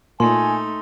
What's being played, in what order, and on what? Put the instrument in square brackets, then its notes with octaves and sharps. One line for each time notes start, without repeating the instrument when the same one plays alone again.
[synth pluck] A#2 [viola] A3 D#4 [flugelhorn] G#5 [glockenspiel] C6